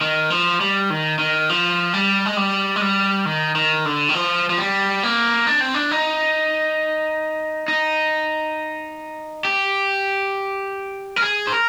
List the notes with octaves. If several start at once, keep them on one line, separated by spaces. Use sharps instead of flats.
D#3
F3
G3
D#3
D#3
F3
G3
G#3
G3
G#3
G3
D#3
D#3
D3
D#3
F3
F3
G3
A#3
D4
C4
D4
D#4
D#4
G4
A#4
G#4
C5
A#4